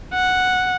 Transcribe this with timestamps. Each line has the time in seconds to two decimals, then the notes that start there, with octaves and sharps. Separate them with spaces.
0.14 F#5